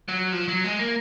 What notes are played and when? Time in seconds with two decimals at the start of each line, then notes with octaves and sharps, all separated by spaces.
0.08 F#3
0.32 F3
0.48 F#3
0.64 G#3
0.79 A#3